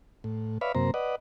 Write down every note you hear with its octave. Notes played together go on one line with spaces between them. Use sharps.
A2
B4 C#5 D5 E5 F5 B5
F#2 C3 A#3 C5 A#5
B4 D5 D#5 F#5